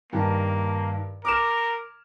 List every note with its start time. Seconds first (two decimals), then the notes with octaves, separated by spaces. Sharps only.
0.13 G2 D#3 A#3
1.25 A#4 D6 F6 E7